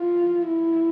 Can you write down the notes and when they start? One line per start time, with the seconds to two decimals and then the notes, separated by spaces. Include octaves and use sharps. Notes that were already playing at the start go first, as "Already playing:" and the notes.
Already playing: F4
0.45 E4